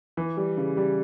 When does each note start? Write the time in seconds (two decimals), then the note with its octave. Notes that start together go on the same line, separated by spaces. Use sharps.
0.17 E3
0.37 G3
0.57 C#3
0.77 G3